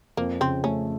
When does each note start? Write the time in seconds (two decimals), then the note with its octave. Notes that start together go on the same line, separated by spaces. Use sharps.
0.17 F2 A#3
0.40 C#3 C4
0.64 A3 C#4